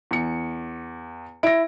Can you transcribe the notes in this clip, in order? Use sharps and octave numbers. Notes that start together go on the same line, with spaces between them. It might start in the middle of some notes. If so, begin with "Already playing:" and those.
E2 C#7
E4 A#6 D7